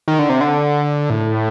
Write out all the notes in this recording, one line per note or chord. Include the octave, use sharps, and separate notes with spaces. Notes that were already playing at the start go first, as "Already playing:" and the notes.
D#3
D3
C3
D3
A2